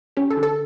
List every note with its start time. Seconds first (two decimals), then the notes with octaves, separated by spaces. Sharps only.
0.17 C#4 G4
0.30 A4
0.37 D3
0.43 A4